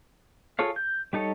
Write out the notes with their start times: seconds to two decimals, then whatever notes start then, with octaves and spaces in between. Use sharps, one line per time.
0.59 F4 G#4 A4 C#5 F5
0.76 G6
1.13 G3 D#4 A4 C#5